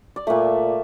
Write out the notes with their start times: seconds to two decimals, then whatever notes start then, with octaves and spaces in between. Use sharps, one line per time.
0.16 D5
0.27 A#2 A3 E5